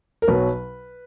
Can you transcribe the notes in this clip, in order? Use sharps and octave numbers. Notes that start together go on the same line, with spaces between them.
A#4
B1 B2 F#3 B4